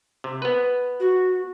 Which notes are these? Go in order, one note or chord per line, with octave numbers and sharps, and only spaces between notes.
C3
B3 B4
F#4